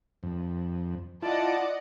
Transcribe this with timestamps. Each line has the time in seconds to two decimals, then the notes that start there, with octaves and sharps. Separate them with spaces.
0.23 F2
1.23 E4 F4 D5 D#5 F#5 A5